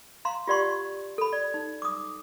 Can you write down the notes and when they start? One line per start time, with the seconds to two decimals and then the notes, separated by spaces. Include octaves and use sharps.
0.25 F5 A#5 C6
0.47 F4 G4 D5 F#5 C6 C#6
1.18 A4 B5
1.33 D5
1.54 D#4
1.82 D6 D#6